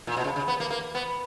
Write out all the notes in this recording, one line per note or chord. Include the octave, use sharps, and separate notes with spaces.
A#2
B2
C#3
C#3
B3
A#3
A#3
B3